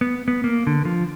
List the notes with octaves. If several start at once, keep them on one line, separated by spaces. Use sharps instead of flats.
B3
B3
A#3
D3
F3